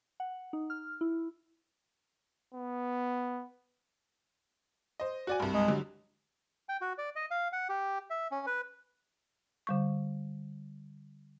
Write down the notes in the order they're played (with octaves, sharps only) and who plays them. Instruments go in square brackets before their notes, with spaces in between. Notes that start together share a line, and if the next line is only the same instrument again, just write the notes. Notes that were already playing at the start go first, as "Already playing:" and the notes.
[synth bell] F#5
D#4
F6
E4
[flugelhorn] B3
[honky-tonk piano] C5 D#5
F#4 D5 G#5
C2 G2
[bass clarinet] G#3
[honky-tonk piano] D3 F#3 G3
[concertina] G5
F#4
D5
D#5
F5
F#5
G4
E5
C#4
B4
[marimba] D3 G3 C#6